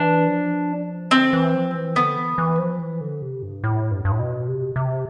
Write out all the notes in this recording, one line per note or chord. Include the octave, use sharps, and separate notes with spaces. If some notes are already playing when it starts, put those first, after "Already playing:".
Already playing: E3 D4
F3
D3 C4
E3
F3
E3
D3 B3
E3
E3
F3
E3
D3
C3
G2
A2
G2
G2
A2
B2
C3
C3